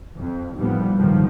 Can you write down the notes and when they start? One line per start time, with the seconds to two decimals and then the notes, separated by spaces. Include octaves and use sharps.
0.17 F2
0.56 D#2 A2 F3 G3 B3
0.98 G1 C#2 G#2 D#3 F3 B3